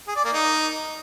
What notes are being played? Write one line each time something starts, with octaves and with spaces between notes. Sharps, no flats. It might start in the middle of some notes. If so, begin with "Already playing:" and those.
G#4
D5
A#3
D#4